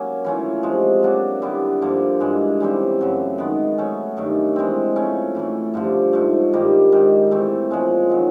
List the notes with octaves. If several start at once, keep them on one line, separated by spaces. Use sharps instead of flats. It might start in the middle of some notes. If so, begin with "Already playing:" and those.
Already playing: F#3 A#3 C#4
E3 A3 C#4 F4
C3 F3 G#3
F#3 A#3 D4 F#4
D3 G3 B3 E4
G2 D3 F3 A#3
G2 E3 G#3
C#3 E3 G3 C4
F#2 C#3 F#3 A3
D#3 G#3 B3
F#3 A3 C#4
G2 D#3 F#3 A3
E3 G#3 C4
F3 A3 C#4 E4
A2 E3 A3
G2 D3 F3
G#2 F3 A3
G2 D#3 G3 A#3
G#2 D#3 G3
E3 A3 C4
A#2 F3 G#3 C#4
D#3 F#3